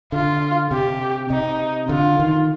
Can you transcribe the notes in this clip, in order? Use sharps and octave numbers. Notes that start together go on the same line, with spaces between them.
D3 F4
C3 G4
C3 D#4
D3 F4
D#3